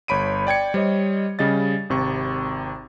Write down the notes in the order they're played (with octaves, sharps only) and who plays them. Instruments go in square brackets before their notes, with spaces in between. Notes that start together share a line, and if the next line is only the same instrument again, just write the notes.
[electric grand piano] G1 C#5 B5 D7 D#7
D5 G5 G#6 C#7
G3 C5 C#5 D#5
C#3 G3 D#5 A6
G#1 C3 C#6